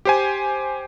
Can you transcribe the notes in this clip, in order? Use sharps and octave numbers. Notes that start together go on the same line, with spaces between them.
G4 C5 G#5